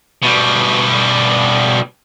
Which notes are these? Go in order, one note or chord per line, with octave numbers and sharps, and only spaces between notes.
B2 G3